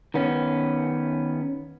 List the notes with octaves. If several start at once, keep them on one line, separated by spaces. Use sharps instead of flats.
D#3 B3 C#4